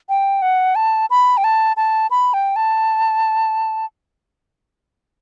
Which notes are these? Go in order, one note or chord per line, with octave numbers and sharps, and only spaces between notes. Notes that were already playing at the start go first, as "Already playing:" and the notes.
G5
F#5
A5
B5
G5
A5
A5
B5
G5
A5